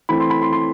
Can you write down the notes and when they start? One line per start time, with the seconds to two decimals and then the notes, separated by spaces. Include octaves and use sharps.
0.09 E3 A3 C4 B5
0.20 C6
0.30 B5
0.42 C6
0.53 C6